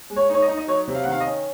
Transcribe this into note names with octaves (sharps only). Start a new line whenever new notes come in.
G#3
C#5
D#4 C#5
D#5
D#4
D#5
F#3 C#5
C3
F5
F#5
D#3 F5
D#5
C#4